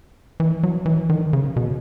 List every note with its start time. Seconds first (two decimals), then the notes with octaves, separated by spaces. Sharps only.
0.40 E3
0.63 F#3
0.86 E3
1.09 D#3
1.33 C#3
1.56 B2